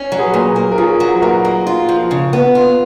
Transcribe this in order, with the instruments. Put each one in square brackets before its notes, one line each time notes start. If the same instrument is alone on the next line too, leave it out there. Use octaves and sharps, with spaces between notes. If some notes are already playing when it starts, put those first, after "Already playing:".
Already playing: [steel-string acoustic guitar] C#4
F#3
[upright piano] G#4 B4
[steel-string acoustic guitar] A#2
A#3
[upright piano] A#4
[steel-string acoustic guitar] C#4 [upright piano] F4 G#4
[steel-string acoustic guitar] F#3
[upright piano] B4
[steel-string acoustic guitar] A#2 [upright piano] F#4 A#4
[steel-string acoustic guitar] A#3
F4
F3
C#3
B3
F4